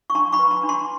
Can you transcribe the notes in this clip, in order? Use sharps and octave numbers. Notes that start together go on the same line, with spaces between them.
C#6
D4 A#5 C6
B5 C#6
B4
A#5 C6
D4
A#5 C6